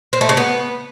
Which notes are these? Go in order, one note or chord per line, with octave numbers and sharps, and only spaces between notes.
C4
A3
C#3
B3